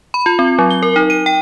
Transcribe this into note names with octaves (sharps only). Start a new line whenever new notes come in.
B5
F4
C4
F#3
G7
A#4
D#4
D#7
G5